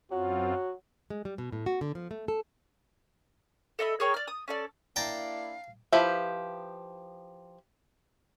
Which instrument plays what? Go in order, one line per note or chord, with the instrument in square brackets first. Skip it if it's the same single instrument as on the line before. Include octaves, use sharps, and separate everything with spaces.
[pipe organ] F#2 C4 F4 [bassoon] F#3 [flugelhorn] F#4
[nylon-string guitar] G#3
G3
B2
A2
F#4
D3
F3
A3
A4
[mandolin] A4 D#5 E5 B5
G#4 A#4 C#5 G5
D5 F6
D#6
C#4 A4 D5
[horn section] A#3 D4 E4 [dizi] F5 [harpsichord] G5 A5 A#5
[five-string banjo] F3 E4 G4 B4 E5